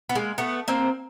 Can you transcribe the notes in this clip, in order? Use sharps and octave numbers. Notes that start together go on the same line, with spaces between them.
B3
G#3 A#3
A3 B3
A#3 C4